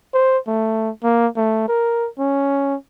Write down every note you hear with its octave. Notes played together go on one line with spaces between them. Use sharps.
C5
A3
A#3
A3
A#4
C#4